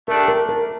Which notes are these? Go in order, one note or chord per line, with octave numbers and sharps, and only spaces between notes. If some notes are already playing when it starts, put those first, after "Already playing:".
A3 D4 G4 A#4
A#4
A#4